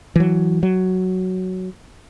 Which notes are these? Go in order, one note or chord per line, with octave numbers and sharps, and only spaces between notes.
E3 F#3
F#3